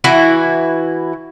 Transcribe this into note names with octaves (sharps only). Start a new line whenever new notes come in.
E3 E4 F#4